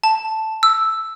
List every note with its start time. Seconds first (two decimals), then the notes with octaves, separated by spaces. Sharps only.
0.04 A5
0.63 E6